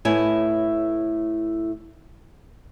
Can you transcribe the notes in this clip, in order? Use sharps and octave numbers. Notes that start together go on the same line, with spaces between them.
A2 A3 B3 E4 C#5 G#5